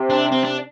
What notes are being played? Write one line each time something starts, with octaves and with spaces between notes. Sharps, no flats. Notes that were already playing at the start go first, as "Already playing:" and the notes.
Already playing: C3
D4
C4
D4